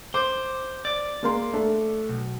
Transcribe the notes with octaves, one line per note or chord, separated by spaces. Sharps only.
C5 D6
D5
G#3 A#3 C6
A3 D4
B1